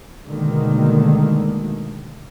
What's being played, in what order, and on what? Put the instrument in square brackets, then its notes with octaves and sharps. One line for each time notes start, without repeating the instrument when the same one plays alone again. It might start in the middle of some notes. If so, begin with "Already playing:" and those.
[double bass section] D2 B2 D3 D#3 G#3 A#3